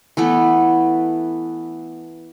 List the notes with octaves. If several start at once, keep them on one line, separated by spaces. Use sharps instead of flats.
E3 A3 B3